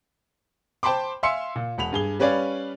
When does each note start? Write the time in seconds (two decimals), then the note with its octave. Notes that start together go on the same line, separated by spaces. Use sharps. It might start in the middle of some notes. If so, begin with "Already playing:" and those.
0.83 C5 G5 A5 B5 C6 D6
1.23 E5 F5 G#5 C6 E6 C#7
1.56 A#2
1.78 E1 F#5 B5 F7
1.93 G2 G#4 G7
2.19 G3 C#4 B4 C#5 D5 F5